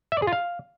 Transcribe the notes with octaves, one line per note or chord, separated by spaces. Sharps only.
E5
D5
G#4
F4
F5